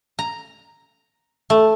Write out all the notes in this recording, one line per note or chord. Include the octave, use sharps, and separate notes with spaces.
A#5
A3